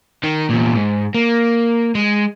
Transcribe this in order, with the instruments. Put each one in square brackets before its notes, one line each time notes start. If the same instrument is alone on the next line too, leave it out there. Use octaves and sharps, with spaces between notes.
[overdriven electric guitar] D#3
E2 A#2
G#2
A#3
G#3